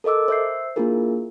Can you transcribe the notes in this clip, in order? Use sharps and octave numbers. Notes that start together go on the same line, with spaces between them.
A4 A#4 D#5 D6 E6
C5 E5 E6 G6 C7
A#3 D4 E4 F4 G#4 A#4